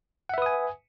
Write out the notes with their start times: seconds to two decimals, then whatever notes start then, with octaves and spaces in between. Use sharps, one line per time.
0.29 F#5
0.34 E5
0.38 B4
0.42 D#6
0.46 G#5